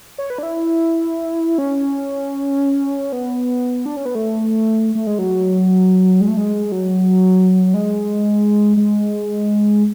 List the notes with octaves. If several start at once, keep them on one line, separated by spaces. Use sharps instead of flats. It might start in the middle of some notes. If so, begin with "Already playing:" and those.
C#5
B4
D4
E4
C#4
B3
D4
C#4
B3
A3
A3
G#3
F#3
G#3
A3
G#3
F#3
G#3
G#3